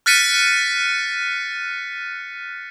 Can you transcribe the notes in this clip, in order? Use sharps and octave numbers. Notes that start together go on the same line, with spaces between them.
F6 F#6 A6 B6 C#7 D#7